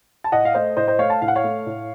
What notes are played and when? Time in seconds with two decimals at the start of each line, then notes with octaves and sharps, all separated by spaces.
0.24 A5
0.32 A2 D#5 F#5
0.45 F5
0.54 A3 C5 D#5
0.77 A2 C5 D#5
0.88 C5 D#5
0.99 A3 C#5 F5
1.10 F5 A5
1.22 A2 F5
1.28 F#5
1.35 C#5 F5
1.44 A3
1.66 A2